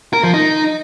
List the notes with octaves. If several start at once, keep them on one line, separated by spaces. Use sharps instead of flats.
A#4
F3
D#4